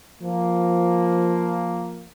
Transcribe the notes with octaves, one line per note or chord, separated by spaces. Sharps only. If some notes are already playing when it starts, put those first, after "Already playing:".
F3 A#3